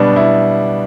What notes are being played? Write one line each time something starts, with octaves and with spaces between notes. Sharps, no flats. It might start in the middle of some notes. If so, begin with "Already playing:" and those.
Already playing: B2 G3 B3 D4
E4